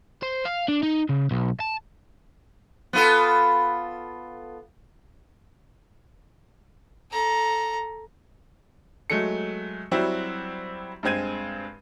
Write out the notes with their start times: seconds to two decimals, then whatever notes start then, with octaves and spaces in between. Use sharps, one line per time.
0.23 C5
0.45 F5
0.68 D4
0.83 D#4
1.09 C#3
1.31 B1
1.60 A5
2.93 B3 F4 A4
7.11 A4 A#5
9.10 F#3 G#3 A3 C#7
9.91 F#3 G3 C4 E4 F#4
11.03 G2 G#3 C4 G#6 D#7